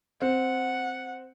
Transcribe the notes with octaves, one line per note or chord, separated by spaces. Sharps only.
C4 F#5